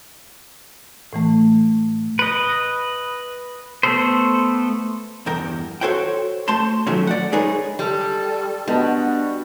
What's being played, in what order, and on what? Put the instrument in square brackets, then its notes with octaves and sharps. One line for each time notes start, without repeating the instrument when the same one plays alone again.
[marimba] A2 E3 A3
[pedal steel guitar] B4 D#5
A3 B3 A4 C5
[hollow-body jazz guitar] E2 G2 A#4 G5
F#4 A4 C5 C#5 F#5 G5
A3 C5 A5 C6
D#3 F3 F#3 A3 C#4
D5 F#5
G#3 D#4 G#4 A#4 B4 C#5
[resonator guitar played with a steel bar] G3 [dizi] A4
[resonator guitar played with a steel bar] G3 [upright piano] B3 D#5 A5 [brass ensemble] D4 F#4